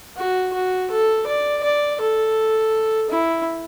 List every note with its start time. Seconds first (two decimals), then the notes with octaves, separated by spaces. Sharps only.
0.17 F#4
0.54 F#4
0.91 A4
1.27 D5
1.63 D5
2.01 A4
3.10 E4